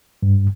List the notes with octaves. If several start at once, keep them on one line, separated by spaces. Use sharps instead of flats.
G2